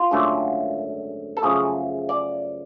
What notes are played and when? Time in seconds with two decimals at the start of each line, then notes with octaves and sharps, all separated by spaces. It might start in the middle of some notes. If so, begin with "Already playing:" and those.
Already playing: F4
0.11 G#1 F#2 D3 F#3 A3
1.37 A4
1.42 F#2 C#3 F3 A3 G#4
2.09 D5